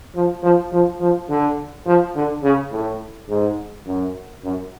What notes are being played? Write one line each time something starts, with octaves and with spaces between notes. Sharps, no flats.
F3
F3
F3
F3
D3
F3
D3
C#3
A2
G#2
F#2
F#2